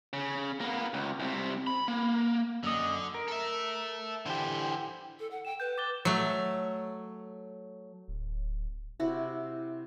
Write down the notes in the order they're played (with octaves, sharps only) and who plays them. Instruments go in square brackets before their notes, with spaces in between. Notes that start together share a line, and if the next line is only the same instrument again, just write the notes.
[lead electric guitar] C#3
A#3 B3
C#2
C2 C3
B5
A#3
[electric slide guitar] F#2 D#5 [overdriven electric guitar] D3
[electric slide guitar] A#4
[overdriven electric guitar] A4 E5
[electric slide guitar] D3 G4 [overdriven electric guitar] E3 C5
[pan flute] A4
F#5
[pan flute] G5 [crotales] E7
[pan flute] B4 [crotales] G6
[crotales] D6 A6 G7
[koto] F#3 A3
[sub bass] D1
[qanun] C3 E4 F#4